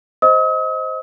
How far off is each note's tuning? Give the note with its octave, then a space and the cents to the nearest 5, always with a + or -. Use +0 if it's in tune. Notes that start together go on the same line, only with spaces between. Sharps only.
C5 +0 D#5 +15 D#6 +45